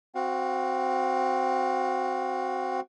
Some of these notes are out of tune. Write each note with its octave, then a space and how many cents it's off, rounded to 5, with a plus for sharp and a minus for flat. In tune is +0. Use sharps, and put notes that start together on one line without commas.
C4 +0 F#4 +0 F5 +30